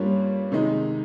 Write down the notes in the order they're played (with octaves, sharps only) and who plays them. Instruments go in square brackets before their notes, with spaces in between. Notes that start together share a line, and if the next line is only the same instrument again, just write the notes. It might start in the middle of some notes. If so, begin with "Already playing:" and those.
Already playing: [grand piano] G2 G3 A#3 C#4 F4
C3 D#3 G#3 D#4